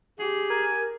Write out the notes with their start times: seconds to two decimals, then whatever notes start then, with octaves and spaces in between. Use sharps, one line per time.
0.19 G4 G#4
0.50 A#4 G#5